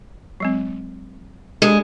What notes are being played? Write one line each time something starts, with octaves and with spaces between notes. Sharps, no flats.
F#3 G#3 C4
G#3 D4 G4 A4